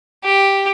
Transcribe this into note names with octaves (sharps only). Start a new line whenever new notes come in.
G4